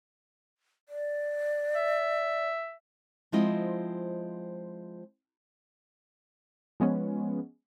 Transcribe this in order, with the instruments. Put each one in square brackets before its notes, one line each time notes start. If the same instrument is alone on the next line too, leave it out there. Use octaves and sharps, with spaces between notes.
[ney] D5
[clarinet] E5
[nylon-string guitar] F3 G#3 C4 E4 F4 D#5
[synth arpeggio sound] F3 G#3 B3 C#4